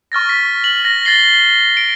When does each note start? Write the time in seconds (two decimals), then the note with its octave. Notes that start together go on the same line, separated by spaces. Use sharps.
0.12 C#6 F6 A6 A#6
0.29 B6
0.64 F#7
0.85 A#6
1.05 A6 A#6 C7 G7
1.77 D7